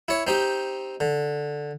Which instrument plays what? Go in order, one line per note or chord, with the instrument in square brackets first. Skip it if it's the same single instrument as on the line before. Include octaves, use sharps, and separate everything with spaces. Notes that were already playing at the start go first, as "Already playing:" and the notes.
[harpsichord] E4 C#5
C4 D#4 G4
D3